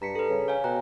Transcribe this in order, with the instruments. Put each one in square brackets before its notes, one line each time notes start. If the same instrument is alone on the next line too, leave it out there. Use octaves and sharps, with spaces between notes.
[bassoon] G2 [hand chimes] A#5 B6 C#7
[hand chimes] A4 B4
[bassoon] C#3
[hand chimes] C#5 F5 G#5
[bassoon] B2 [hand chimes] G5 A#5 F#6